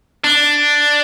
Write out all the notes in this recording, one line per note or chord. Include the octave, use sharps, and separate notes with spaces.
D4